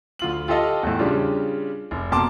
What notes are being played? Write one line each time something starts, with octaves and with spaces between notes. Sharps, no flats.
D2 F4 F#7
F4 G4 A4 D#5 F5
E2 A2
C#3 G3 D4 F4
F1
F2 B2 A#3 A5 C6 D6